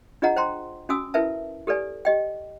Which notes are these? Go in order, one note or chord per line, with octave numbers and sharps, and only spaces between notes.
D4 F4 G#4 D#5 F#5 A#5
C5 G5 A#5 C6
C#4 F#4 G#5 D#6 E6
E4 A#4 B4 E5 A5
G4 A4 B4 D5 G#5
G4 D#5 G5